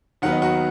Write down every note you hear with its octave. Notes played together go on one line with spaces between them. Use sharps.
D#2 D#3 F#3 B3 F#5
D#5
F#4 F#5